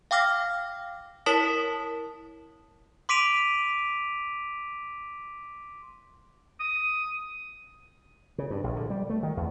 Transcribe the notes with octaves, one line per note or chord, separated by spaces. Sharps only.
F5 G5 D6 F6 A#6
E4 A#4 C#5 A5 D#6 B6
C6 D6 B6 D7 D#7 F7
D#6
C#3
G2
A#1
D3
G3
A3
D#3
E2